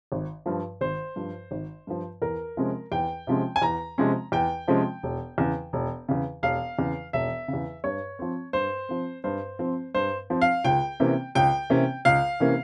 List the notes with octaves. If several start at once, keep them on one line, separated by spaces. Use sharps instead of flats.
G#1
G2 F3
G#1 C5
G2 F3
G#1
G2 F3
E2 A#4
C3 F3 G#3 C#4
E2 G5
C3 F3 G#3 C#4
G#5
E2 A#5
C3 F3 G#3 C#4
E2 G5
C3 F3 G#3 C#4
E1
E2 C#3
E1
E2 C#3
E1 F5
E2 C#3
E1 E5
C#3
E2
G2 C#5
F3 C4
G2 C5
F3 C4
G2 C5
F3 C4
G2 C5
F3 C4
F5
C#2 G5
C3 E3 A#3 C#4
C#2 G5
C3 E3 A#3 C#4
C#2 F5
C3 E3 A#3 C#4